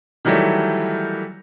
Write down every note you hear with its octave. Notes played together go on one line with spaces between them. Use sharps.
D#3 E3 F#3 G3 A3